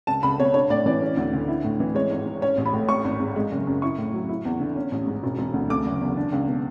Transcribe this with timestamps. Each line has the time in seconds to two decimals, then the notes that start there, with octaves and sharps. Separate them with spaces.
0.07 C#2 A5
0.23 C#2 B5
0.39 B2 C#5
0.54 D4 C#5
0.70 A2 D5
0.86 E3 D5
1.02 C#4
1.17 D2
1.33 D3
1.48 E4
1.64 A2
1.80 E3
1.95 G#3 C#5
2.11 G#1
2.26 G#2
2.41 C#4 C#5
2.57 A1
2.66 B5
2.73 A2
2.89 C#4 C#6
3.05 G#1
3.20 G#2
3.36 G#3
3.51 F#1
3.67 F#2
3.82 E4 C#6
3.98 A2
4.13 F#3
4.29 E4
4.45 E2
4.60 D3
4.76 C#4
4.91 A1
5.07 G#2
5.23 E1
5.38 E1
5.53 D2
5.69 A3 D6
5.86 F#1
6.01 E2
6.17 D4
6.32 C#2
6.48 B2